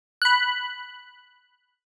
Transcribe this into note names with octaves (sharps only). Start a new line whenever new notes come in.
B5 F#6